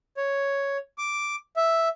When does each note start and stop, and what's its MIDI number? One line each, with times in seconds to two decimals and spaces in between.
0.17 0.77 73
0.98 1.35 86
1.57 1.88 76